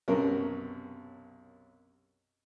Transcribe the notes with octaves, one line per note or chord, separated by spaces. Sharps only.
B1 F#2 C3 C#4 A#4